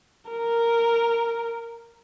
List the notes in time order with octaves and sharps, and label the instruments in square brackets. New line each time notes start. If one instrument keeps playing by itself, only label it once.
[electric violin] A#4